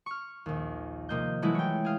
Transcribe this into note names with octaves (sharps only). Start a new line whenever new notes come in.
C#6 F6
A#1 D#2
C3 F3 A#3 D#5 G6
E3 F#3 G#3 A3 E4
C#5 G5
G#4 F5